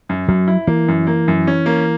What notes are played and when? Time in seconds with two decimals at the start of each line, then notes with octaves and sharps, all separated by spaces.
0.09 F#2
0.28 F#2 F#3
0.48 E4
0.67 E3 A#3
0.88 F#2
1.07 A#3
1.28 F#2
1.47 C#4
1.66 A#3